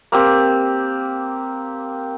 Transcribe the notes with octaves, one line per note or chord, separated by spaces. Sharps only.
A#3 C4 G4